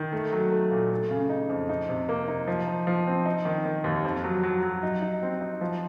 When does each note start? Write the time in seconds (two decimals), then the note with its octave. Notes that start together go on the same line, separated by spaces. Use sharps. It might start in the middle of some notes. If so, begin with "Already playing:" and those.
Already playing: D#3
0.13 A3
0.33 F#3
0.52 A3
0.71 A#2
0.91 A3
1.11 C#3
1.30 D#4
1.49 F2
1.69 D#4
1.89 C3
2.09 A#3
2.28 D#4
2.47 F3
2.67 D#4
2.87 F3
3.07 C4
3.26 D#4
3.45 D#3
3.65 D#3
3.84 D#2
4.04 F2
4.24 F#3
4.43 F#3
4.63 F#3
4.83 D#4
5.02 D#4
5.22 C4
5.41 D#4
5.61 F3